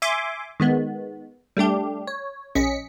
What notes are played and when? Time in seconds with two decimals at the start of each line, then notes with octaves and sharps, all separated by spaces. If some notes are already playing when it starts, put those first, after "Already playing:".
0.02 E5 G#5 C6 D6
0.60 D#3 G#3 B3
1.57 G3 A3 D4 G4
2.07 C#5
2.55 A#1 C#4 D#5 B6 C#7